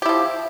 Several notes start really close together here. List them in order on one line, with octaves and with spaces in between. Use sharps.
G4 E4 F3